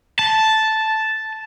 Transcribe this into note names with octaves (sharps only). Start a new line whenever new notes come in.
A5